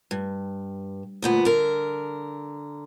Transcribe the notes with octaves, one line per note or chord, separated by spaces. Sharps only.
G2
D2 A#2 B3
D3 A#4